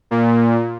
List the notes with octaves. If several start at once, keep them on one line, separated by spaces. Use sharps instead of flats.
A#2